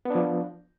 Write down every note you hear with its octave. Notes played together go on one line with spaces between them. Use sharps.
F3 B3 D4